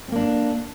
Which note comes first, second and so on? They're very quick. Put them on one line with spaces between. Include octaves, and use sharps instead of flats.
C4 A#3 D4